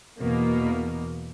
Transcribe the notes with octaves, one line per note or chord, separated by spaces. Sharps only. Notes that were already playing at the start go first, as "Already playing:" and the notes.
E2 B2 A#3